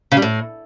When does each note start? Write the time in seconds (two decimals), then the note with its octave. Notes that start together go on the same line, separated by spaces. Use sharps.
0.12 C#3
0.17 G3
0.22 A2